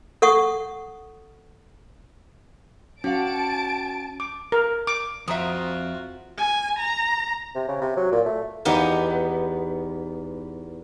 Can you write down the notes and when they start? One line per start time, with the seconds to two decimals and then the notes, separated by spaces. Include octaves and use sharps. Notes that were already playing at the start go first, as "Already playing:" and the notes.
0.22 A4 F#5 C#6 D#6
3.04 C#4 F#4 F5 F#5 A5 D7
4.20 D6
4.52 A#4
4.87 D6
5.28 F2 C4 F4 F#4 E5 A#5 D#6
6.38 G#5
6.80 A#5
7.55 C3
7.68 C#3
7.81 C3
7.97 F#3
8.12 A#2
8.26 A3
8.65 E2 B3 D#4 G4